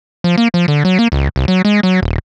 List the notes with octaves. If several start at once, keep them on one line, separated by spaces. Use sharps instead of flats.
F3
A#3
F3
D3
F#3
A#3
C#2
C2
F#3
G#3
F#3
D#1